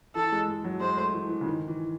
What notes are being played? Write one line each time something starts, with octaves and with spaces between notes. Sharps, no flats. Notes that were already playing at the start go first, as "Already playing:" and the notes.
E3 A4
G#3
G#3
F#3
G#3 C5
A3
E3
E3
C#3
D#3
E3